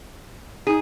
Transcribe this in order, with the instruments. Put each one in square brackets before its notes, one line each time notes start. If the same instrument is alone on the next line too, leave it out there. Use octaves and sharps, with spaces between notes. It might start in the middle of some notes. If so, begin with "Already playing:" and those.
[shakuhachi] D#4 [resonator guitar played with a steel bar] G#4